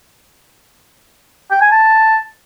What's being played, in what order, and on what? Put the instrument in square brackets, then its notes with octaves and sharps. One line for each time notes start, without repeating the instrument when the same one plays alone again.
[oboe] G5
G#5
A5